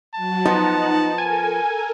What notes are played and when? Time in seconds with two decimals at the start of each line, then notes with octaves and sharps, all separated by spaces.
0.15 F#3 F#4 A5
0.46 F3 B3 D#4 F#5 A#5 F#6
1.18 A4 A#4 G#5